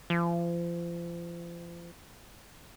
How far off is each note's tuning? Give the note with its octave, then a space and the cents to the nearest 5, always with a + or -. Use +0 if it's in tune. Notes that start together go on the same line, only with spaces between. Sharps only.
F3 -35